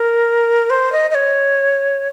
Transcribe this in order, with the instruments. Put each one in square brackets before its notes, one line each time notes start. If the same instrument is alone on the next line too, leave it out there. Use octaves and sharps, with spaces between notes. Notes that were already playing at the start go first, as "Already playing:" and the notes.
Already playing: [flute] A#4
C5
D#5
D#5
C#5